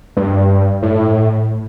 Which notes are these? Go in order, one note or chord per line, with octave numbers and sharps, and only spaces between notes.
G2
A2